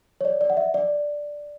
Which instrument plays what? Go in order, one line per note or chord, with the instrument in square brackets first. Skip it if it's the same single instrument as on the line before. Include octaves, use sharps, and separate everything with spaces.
[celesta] C#5
D5
D5
F#5
E5
D5